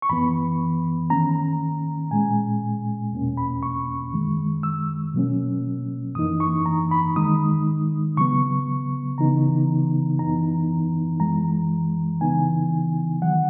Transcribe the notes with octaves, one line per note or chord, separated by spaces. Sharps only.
C#6
F#2 E3 B3 B5
D#3 A#3 C#4 A#5
A#2 G#3 C#4 G#5
E2 B2 A#3 C#4
B5
C#6
F#2 D#3 G#3
E6
B2 F#3 A#3 C#4
F#2 E3 A#3 D#4 D#6
C#6
A#5
B5
D#3 G#3 D#4 D#6
C#3 F#3 B3 C#6
C#3 E3 B3 D#4 A#5
F#2 E3 B3 D#4 A#5
F#2 E3 G#3 A#5
C#3 E3 B3 D#4 G#5
D#3 F#3 F#5